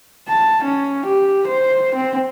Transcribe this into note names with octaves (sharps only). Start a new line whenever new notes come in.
A5
C#4
G4
C5
C4